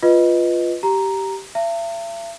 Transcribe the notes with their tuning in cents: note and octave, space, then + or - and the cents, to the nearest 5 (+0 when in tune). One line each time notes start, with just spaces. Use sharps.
F4 +0 B4 +0 D#5 +0
G4 -15 A#5 +0
E5 +40 A#5 -45